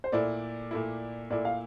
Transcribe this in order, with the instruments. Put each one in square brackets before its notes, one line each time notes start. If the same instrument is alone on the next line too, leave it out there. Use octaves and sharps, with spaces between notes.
[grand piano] C5
[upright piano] A#2 A3 E4 [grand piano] D5
[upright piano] A#2 A3 E4
[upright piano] A#2 A3 E4 [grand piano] D5
[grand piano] F5